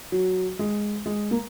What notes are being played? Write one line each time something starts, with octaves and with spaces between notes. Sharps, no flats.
F#3
G#3
G#3
A#3